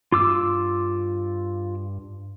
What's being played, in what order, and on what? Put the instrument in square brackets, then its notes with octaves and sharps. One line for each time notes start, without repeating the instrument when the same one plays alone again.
[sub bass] G2 [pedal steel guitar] F4 D6 E6